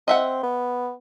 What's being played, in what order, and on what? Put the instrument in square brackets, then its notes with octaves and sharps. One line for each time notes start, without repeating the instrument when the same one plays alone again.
[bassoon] C4 [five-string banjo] D#5 E5 F#5
[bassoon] B3